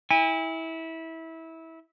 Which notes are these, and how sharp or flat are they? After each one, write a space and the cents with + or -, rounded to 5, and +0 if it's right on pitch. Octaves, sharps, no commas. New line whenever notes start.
E4 -20 G#5 -40